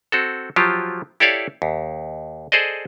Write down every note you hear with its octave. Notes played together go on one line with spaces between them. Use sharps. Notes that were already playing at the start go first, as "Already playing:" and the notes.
C4 F#4 A4
F3 F#3 F4 G4
E4 G4 A4 C#5 D5 F5
D#2
G#4 A4 C5 D5 D#5